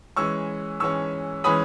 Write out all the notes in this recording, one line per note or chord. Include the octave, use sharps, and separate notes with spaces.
E3 G#3 C#4 C#6 E6
E3 G#3 C#4 C#6 E6
E3 G#3 C#4 B5 D#6